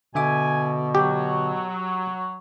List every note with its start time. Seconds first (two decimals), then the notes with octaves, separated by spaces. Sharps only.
0.15 B2 D3 E5 G#5 D6
0.95 F#3 G4